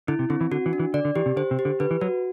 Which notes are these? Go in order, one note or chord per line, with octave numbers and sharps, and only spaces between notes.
D3 E4
C3
D3 C4
E3
D3 F#4
E3
D4
E3
D3 D5
D3
E3 G4
C3
D3 C5
C3
G4
D3
D3 B4
E3
F#3 F#4